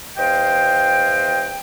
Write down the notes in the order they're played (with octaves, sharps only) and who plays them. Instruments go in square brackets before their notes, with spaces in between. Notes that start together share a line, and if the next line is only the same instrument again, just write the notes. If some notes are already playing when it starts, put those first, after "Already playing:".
[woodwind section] E2 C5 D#5 F5 G5